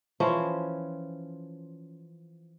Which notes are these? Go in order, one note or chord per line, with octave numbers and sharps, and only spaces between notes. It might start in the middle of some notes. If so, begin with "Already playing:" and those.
E3 F3 C#4 C5